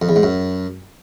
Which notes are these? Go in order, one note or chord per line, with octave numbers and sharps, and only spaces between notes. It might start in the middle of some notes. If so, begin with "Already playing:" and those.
F2
E2
G#2
F#2